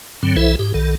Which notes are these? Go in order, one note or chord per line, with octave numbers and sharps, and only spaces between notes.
G2 D3 F#3 C4
B1 E3 E4 A4 C5 E5
G#2 G4
B1 D#3 A4